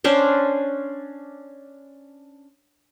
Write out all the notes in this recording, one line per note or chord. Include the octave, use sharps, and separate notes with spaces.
C#4 D4 C5